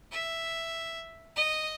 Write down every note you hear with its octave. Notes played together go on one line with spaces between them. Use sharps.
E5
D#5